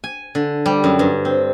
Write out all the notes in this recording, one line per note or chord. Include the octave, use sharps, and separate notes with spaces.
G#5
D3
G3
F#2
G2
C4